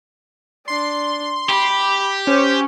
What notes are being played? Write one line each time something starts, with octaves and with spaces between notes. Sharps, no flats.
D4 C6
G4 B5
C#4 C5